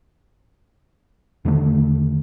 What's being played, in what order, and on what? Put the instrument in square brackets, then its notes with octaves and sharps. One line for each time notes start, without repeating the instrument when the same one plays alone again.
[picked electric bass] E2 D3 D#3 A3